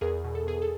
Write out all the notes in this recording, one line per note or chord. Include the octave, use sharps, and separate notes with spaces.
E2 G#4 A#4
B2
A4
E2 G#4
A4